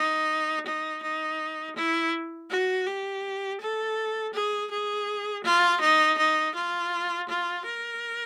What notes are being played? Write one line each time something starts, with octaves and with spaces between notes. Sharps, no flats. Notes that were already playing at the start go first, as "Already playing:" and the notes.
Already playing: D#4
D#4
D#4
E4
F#4
G4
A4
G#4
G#4
F4
D#4
D#4
F4
F4
A#4